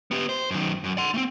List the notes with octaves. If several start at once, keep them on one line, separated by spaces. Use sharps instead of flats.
B3 G4
C5
F#2 D#3
F#2
F#5 C6
A3 C4